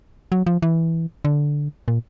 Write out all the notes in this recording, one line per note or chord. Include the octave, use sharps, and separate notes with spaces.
F#3
F3
E3
D3
A#2